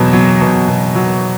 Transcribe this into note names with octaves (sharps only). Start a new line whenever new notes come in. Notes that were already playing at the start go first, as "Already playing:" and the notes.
Already playing: E2 B2 F#3
F#3
B2
B2
F#3